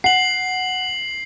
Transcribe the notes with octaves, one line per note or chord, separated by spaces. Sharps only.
F#5 C7 F#7